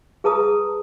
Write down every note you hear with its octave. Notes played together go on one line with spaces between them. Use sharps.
G#4 B4 A5 A#5 D#6